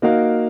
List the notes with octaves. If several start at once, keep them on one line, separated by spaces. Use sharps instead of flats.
A#3 D#4 F#4 A#4 F5